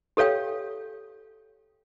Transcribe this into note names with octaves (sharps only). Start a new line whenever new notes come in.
G4 A4 C#5 F5 G5